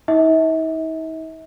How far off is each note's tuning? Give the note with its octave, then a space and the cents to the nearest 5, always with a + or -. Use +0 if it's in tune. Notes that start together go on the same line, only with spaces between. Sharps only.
D#4 +45 E5 -45